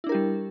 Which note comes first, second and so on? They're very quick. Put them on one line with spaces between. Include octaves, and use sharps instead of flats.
E4 D4 A#4 G4 G3